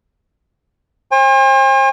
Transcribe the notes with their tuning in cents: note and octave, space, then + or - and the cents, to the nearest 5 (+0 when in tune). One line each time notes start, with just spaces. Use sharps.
C5 +40 G#5 -45